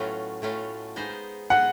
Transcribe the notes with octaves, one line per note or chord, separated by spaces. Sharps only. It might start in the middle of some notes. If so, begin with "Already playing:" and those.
Already playing: A2 F#3 A3 B3 C#4 F4
A2 F#3 A3 C#4 F4
G#3 B3 D#4 G#4 C5
G#3 B3 D#4 G#4 C5 F#5